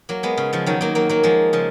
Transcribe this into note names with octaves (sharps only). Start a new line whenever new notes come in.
F#3 A#3
G#3 B3
C#3
C#3 F3
D#3 F#3
F#3 A#3
F#3 A#3
F#3 A#3
F3 G#3
C#3 F3